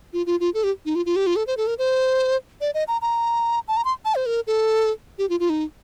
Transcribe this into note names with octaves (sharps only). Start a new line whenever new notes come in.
F4
F4
F4
A4
G4
D#4
F4
F4
G4
F4
A4
C5
A4
A#4
C5
D5
D#5
A#5
A#5
A5
A#5
C6
A5
C5
A#4
A4
G4
F4
F4
D#4